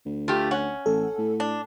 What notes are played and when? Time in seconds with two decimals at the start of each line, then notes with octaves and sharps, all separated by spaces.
0.05 D2
0.28 A3 F4 G4
0.51 C#4 F#5
0.86 A1 A4
1.18 A2
1.40 D4